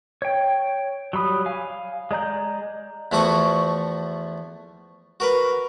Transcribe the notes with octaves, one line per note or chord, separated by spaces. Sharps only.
C#5 G5
F#3 G3 B5 D#6
F5 G#5
G#3 D5 A#5 G6
E2 F3 A3 F#4 F#5 C#6
F#4 A#4 B4